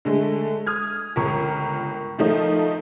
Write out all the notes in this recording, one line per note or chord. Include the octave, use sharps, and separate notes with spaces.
D3 G#3 A3
D#6 F6 G#6
G1 C#2 A#4 C#6
D#3 F3 A3 D#4